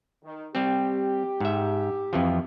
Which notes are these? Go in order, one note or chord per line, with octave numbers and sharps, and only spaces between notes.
D#3
G3 C4 G4
G#2 E5
F2 E3 F3